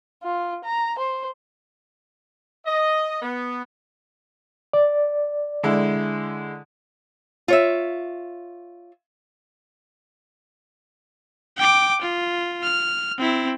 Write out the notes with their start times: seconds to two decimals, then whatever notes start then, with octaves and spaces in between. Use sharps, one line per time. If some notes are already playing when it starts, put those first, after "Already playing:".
0.23 F4
0.64 A#5
0.98 C5
2.66 D#5
3.22 B3
4.73 D5
5.63 D3 G#3 E4
7.48 F4 C#5 E5
11.57 G5 D6
12.01 F4
12.63 F6
13.18 C4 E4